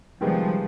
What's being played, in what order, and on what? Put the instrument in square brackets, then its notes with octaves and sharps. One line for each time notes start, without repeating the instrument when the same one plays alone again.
[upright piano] C3 D#3 G#3 B3 [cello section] F3 G3